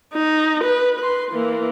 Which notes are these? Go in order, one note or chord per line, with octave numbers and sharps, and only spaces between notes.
D#4
B4
B4 C6
E3 A#3